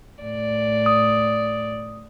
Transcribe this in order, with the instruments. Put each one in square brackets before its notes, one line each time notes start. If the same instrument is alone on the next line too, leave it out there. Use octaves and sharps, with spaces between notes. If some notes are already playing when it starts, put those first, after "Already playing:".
[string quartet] A2 D5
[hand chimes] D#6